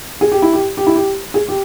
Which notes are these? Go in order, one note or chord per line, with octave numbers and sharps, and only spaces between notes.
G#4
G4
E4
G4
G4
E4
G4
G#4
G4